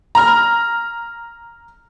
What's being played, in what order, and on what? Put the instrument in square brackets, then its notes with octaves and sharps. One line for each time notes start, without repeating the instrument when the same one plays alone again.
[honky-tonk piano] A#5 F6